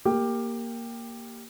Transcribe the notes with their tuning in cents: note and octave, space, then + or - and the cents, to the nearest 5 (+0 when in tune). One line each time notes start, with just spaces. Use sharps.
A#3 +0 G4 +10